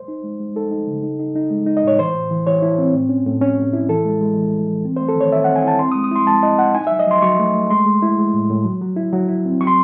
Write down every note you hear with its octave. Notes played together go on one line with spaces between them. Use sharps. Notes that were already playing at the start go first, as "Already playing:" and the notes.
Already playing: C5
D#4
G#3
G#3
D#4 A4
D#4
C#3
D#4
D#4
D#4
G#3
D#4
D#5
A2 C#5
E3 C5
A2
E3
E3 C#5
E4
C4
A2
C#4
A2
C#4
A2
E4
E3 A4
G#3
G#3
E3
E3
E3
C4
C5
A3
A4
D#3 C#5
D#3 E5
F#5
C4
G#5
E4 A5
C4 C6
D#6
G#3
D#6
E4 C6
G#3 A5
E4 D#5
E4 F#5
D#4 G#5
E5
F#3
D#5
F#3 C6
F#3 C#6
A3
A3
G#3 C6
G#3
E4
G#3
A2
A2
F#3
F#3
E4
F#3
E4
C4
F#3 C#6
C6